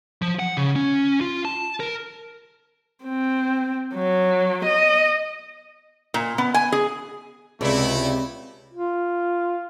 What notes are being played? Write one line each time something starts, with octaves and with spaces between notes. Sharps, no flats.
F3
F#5
C#3
C#4
F4
A5
A#4
C4
F#3
D#5
A#2
B3
G#5
G#4
C#2 C3 A3 C4 E4 D5 B5
F4